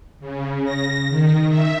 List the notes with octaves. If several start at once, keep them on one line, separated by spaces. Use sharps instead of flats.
C#3
A#6
D#3
E5